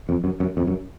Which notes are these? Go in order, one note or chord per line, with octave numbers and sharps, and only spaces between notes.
F2
F#2
F#2
F2
F#2